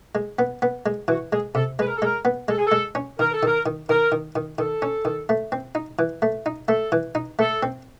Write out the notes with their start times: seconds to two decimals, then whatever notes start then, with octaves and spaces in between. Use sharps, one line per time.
0.15 G#3
0.39 B3
0.62 B3
0.86 G#3
1.08 E3 F#4
1.32 G#3 G#4
1.55 C3 A4
1.79 G#3 B4
1.87 A#4
1.96 A4
2.02 G#3 A#4
2.25 B3
2.48 G#3 A4
2.58 G#4
2.66 A4
2.72 G#3
2.95 C#4
3.19 D#3 A#4
3.33 A4
3.43 D#3 A#4
3.66 D#3
3.89 D#3 A#4
4.12 D#3
4.36 D#3
4.58 D#3 A4
4.82 C#4
5.05 D#3
5.29 A3
5.52 C4
5.75 D#4
5.99 E3
6.22 A3
6.46 D#4
6.68 A3 A4
6.92 E3
7.15 D#4
7.39 A3 A4
7.63 C4